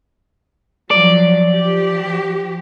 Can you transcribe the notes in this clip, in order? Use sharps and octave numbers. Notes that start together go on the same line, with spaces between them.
F3 F#3 D5
F3 G4